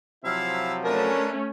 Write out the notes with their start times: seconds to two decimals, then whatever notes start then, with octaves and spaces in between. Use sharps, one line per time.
0.25 C3 F3 F#3 E4 E5 F5
0.84 A3 C#4 D4 A#4 B4 A5